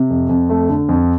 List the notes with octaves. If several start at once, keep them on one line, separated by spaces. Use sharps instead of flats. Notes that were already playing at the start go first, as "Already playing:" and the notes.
Already playing: C3
F2
F2
A3
D3
F2